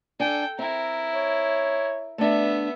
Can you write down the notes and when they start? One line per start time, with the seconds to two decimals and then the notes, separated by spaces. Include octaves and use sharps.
0.20 D4 A4 G5 G#5
0.59 C4 E4 A#4
1.13 C#5
2.18 A3 B3 D4 E5